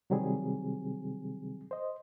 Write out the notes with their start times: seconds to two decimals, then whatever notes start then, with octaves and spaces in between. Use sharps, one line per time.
0.10 C3 D#3 F#3 G3 C4 G#4
1.71 C5 D#5